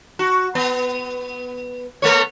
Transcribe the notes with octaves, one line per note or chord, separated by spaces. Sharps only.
F#4
B3
A3 B3 C#5